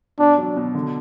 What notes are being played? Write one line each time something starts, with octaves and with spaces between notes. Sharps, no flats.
B2 D4
F#3
B2
D3